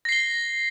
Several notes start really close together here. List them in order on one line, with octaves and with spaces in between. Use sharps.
A#6 C7 G7